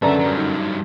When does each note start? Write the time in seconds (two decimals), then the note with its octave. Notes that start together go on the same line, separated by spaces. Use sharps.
0.02 F#2 D3 A4 B4 D5 E5 A#5
0.19 G2 F#3
0.38 D#4